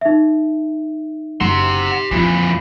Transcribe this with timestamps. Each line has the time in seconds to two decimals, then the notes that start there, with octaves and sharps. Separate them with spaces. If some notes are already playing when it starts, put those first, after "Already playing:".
0.01 D#4 E5
1.41 F#1 G4 F#5 A#5 C6 E6
2.11 F2 A#2 E3 F4